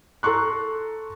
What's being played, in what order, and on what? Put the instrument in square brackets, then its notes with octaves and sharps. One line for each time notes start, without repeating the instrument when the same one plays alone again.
[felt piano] A4 A#5 C6 C#6 F#6